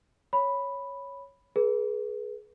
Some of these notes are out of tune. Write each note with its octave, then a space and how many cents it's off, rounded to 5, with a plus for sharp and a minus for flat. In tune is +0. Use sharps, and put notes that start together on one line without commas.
C#5 +0 B5 +0
G#4 +20 B4 -25